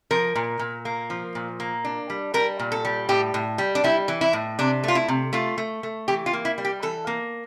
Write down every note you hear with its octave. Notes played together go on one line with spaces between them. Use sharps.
F3 A#4
A#2
A#2
A#3
F3
A#2
A#3
D4
G3
G3 A#4
A#2
A4
G3
A2 G4
A2
G3
D4
G3 E4
E3
E4
A2
C3 D4
A3 F4
E4
C3
A3 F4
A3
A3
E3 G4
F4
A#3
E4
G3
G4
E3 A4
A#3